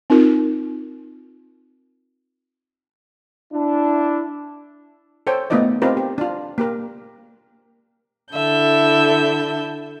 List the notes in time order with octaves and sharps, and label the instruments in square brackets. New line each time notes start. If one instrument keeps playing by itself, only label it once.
[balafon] C4 D#4 F4 A#4
[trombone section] D4 E4
[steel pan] A4 C5 C#5 G5
A3 B3 D#4 F4 D5 D#5
C4 D#4 F4 G4 A#4 B4
G4
D4 F4
A#3 G4 A#4
[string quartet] D3 E4 A4 E5 G6